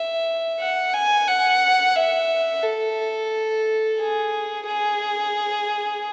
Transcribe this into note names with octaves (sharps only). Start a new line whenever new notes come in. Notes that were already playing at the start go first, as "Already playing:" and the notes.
Already playing: E5
F#5
G#5
F#5
E5
A4
G#4
G#4